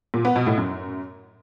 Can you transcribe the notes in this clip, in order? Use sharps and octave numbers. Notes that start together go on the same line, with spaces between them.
A#2
B3
B2
A2
F#2